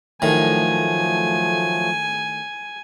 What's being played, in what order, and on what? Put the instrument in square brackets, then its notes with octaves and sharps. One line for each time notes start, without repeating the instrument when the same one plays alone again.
[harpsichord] A2 D#3 [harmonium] F3 F#3 A3 [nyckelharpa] G#5